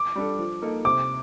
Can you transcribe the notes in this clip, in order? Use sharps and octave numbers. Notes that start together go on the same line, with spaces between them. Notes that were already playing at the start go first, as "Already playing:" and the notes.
Already playing: D6
G3 D4 A4
F3
A#3 D#4 A4
C3 D6